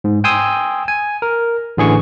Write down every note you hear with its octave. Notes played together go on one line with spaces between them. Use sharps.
G#2
G5 G#5 C6 D#6 E6
G#5
A#4
A1 D3 E3 G#4 G#5 C#6